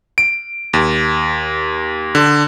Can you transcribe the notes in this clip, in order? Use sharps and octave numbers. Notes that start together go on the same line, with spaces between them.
D7
D#2
D3